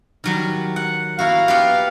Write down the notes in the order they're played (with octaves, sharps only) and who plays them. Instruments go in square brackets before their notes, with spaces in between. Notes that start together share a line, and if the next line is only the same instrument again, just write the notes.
[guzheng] D#3 F#3 G3
F#5
[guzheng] A#3 E4 F#4 [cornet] F5
[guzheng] B3 F4 G4